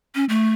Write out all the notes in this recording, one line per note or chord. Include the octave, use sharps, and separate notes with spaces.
C#4
A3